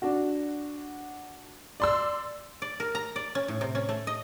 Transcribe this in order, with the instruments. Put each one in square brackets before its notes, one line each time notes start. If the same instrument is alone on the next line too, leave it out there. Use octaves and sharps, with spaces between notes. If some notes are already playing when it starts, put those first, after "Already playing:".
[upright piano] D4 F#4
[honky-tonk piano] D5 C6 E6
[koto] D5
A#4
A#5
D5
C#4
A2
C3
C#4
A3
D#5